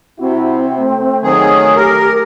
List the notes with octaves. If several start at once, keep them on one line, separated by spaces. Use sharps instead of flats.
C3 C4 E4 F#4
A3
D#3 F#3 G#4
G4 A#4